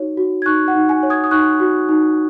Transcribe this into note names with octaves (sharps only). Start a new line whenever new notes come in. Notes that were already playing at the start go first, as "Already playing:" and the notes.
Already playing: D#4 F#4 C#5
F#4
G#6
D#4 C#6 F#6
F#5
D#4
G#5
C#5
D#6 G#6
D#6
D#4 C#6 F#6
F#4
D#4